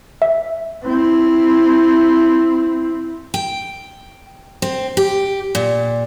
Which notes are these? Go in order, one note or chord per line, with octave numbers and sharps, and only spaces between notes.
E5
C4 E4
G5
C4
G4
A#2